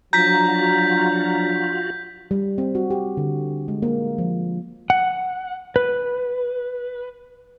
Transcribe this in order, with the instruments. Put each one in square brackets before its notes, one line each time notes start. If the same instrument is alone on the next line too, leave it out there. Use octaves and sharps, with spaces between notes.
[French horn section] F3 F#3 D4 [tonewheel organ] F4 F#4 [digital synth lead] A#5 [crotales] G6 B6
[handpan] G3
C4
F#4
G4
D3
G#3
A#3
F3
[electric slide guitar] F#5
B4